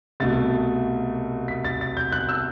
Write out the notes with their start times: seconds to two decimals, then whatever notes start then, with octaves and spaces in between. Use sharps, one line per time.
0.20 C2 B2 A3 A6
1.48 B6
1.64 A6
1.81 A6
1.97 G6
2.12 F#6
2.29 E6